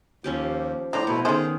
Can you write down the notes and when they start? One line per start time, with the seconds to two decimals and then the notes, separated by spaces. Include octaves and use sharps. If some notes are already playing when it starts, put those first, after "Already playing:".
0.24 D#2 F3 C#4 G4
0.93 A2 D4 A4 C5 D5 A#5
1.07 B2 A3 B3 E4
1.25 D#3 C#4 D#4 G#4 A4 C5